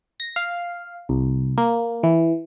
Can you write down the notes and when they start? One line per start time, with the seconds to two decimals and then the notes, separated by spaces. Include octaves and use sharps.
0.20 A#6
0.36 F5
1.09 C2
1.58 A#3
2.03 E3